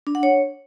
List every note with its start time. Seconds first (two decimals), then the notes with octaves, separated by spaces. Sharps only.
0.07 D4
0.15 F#5
0.23 C#5